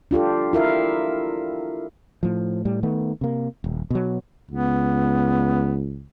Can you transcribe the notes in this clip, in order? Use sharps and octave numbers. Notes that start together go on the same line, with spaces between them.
D4 F4 G4 A4
E4 F4 A#4 E5 F5
A2 F3
A2 G3
D#3 A3 B3
C3 A#3
D#1
B2 F#3
C#2 B3